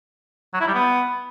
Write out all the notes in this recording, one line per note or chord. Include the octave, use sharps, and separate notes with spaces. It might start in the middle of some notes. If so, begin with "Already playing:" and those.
F#3
E4
G3
B3